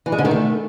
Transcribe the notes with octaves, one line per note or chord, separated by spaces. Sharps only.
E3
G#3
D3
D#3
A3